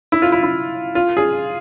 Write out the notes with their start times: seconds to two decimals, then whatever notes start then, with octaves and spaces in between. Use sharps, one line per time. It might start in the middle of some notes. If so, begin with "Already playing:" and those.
0.12 E4
0.22 F4
0.32 E4
0.43 E4
0.95 F4
1.17 G#4